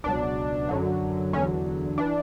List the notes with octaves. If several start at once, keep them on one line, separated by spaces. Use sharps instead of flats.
C#2 B2 F#3 D4
F#2 D3 F#3
E2 D3 F#3 C#4
E3 D4